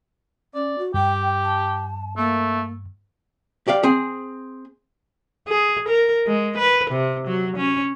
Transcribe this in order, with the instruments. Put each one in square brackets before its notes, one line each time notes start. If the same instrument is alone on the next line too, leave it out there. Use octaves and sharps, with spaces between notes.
[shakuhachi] C#4 [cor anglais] D5
[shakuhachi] F#4
[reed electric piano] G2 [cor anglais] G4 [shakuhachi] G5
[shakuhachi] A5
[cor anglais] A3 [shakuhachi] A#3
[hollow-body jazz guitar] G4 D5 F5
C4 G#4
[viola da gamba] G#4
A#4
G#3
B4
C3
F#3
C#4